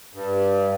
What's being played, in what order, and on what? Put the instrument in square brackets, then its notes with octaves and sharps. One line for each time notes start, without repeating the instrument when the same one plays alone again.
[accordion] G2